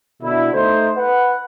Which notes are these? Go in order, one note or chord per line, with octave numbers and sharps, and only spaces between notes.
B2 D3 E4
A3 D#4 C5
B4 F#5